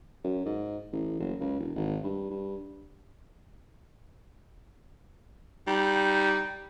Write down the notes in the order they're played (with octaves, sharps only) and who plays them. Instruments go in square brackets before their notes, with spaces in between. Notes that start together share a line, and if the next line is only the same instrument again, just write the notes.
[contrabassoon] F#2
G#2
A1
F#1
C#2
E1
G#1
G2
G2
[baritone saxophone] G3 [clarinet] D#4